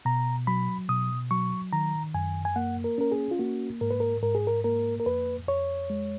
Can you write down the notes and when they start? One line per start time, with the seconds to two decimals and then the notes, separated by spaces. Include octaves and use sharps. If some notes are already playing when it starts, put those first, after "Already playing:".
0.05 B2 A#5
0.47 F#3 B5
0.89 B2 D#6
1.31 F#3 C#6
1.73 D#3 A#5
2.14 F#2 G#5
2.45 G#5
2.56 A#3 F#5
2.84 A#4
2.98 C#4 A#4
3.12 G#4
3.31 F4
3.39 A#3 F#4
3.81 G#2 A#4
3.91 B4
4.00 A#4
4.23 G#2 A#4
4.35 G#4
4.47 A#4
4.64 A#3 A#4
5.00 A#4
5.06 F2 B4
5.48 F2 C#5
5.90 G#3